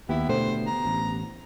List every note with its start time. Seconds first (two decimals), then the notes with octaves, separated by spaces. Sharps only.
0.09 D#2 B3 E4 G4
0.29 B2 D3 A3 C5
0.67 A#5
0.85 A1